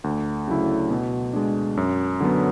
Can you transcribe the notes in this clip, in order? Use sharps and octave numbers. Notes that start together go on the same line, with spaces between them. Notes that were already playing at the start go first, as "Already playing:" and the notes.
D2
C#3 F#3 A3 E4
B2
G#3 D4
F#2
D3 F#3 B3